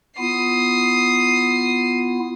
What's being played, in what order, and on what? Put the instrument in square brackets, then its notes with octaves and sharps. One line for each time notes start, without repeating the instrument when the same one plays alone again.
[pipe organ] B3 E4 F4 [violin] D#6 C7